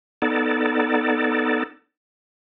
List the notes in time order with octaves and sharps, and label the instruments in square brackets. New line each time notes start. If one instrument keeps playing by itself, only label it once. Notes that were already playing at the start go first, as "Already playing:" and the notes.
[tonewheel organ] B3 D#4 A4 D5